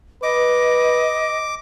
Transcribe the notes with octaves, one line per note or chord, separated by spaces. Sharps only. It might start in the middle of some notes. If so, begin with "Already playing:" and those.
B4 D#5 D6